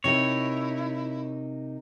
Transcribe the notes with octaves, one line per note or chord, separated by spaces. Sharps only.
C3 D#4 E4 A#4 C#5